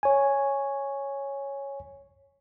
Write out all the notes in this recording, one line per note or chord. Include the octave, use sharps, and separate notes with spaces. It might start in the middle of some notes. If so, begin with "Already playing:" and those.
C#5 G#5